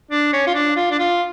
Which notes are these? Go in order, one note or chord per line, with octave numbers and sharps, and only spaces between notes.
D4
C#4
F4
D4
F4
D4
F4